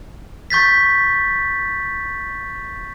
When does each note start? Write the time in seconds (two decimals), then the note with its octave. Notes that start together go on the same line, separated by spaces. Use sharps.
0.50 C#6 G6 A6 B6